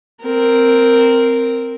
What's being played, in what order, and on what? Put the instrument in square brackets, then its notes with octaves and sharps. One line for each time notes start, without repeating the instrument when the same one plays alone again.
[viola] C4 A#4